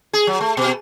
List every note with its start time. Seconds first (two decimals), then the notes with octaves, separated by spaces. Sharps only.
0.13 G#4
0.27 F#3
0.41 A3
0.57 B2